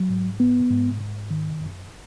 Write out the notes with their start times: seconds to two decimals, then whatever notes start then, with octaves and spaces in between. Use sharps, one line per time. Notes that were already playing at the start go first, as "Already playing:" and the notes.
Already playing: F#3
0.10 G#2
0.40 B3
0.70 G#2
1.00 G#2
1.30 D#3
1.61 F#2